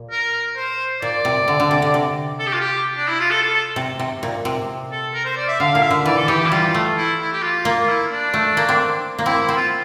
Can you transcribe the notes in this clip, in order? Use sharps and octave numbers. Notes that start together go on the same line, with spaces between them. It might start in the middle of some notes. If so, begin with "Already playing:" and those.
Already playing: A#2
A#4
C5
A#2 D5
C3
D3
D3
C3
D3
C3
A4
G4
F4
G4
D4
E4
F4
A4
A4
A4
C3
C3
A#2
C3
A4
A#4
C5
D5
E5
D3 F5
A#2 F5
E5
D3
E3 D5
A4
E3 G4
G4
E4
G3 F4
A3
E4
E4
G4
F4
A#3
F4
E4
D4
A3
A#3
C4
A#3
C4 E4
E4
C4
F4